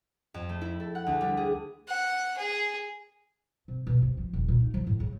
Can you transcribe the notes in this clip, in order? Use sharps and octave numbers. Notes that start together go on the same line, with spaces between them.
F2
A3
E4
A4
F#5
D2
G3
G#4
F#5
G#4
C3
B2
C3
F3
D#1
A#2
D#4
F3
A2
C#3